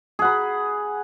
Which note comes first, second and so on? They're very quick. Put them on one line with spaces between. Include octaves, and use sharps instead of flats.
G#4 F#5 B5